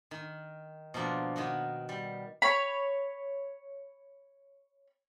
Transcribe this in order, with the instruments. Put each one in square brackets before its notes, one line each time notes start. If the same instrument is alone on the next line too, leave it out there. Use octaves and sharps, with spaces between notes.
[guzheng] D#3
B2 F3 A#3 D4
D#3 B3 F#4
G3
[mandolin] C#5 B5